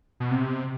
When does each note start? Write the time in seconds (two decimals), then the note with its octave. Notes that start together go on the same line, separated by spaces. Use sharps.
0.20 B2
0.31 C3